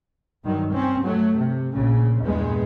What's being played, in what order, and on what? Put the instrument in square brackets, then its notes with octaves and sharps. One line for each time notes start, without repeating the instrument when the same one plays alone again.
[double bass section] G2 D#3 F#3
C4 C#4
F#3 A3
C3
A#1 C#3
E2 G2 A#2 G#3 B3